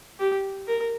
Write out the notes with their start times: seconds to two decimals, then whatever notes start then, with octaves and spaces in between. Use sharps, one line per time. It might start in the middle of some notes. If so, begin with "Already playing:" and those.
0.19 G4
0.68 A#4